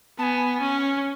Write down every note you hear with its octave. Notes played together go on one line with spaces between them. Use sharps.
B3 G#5 A5
C#4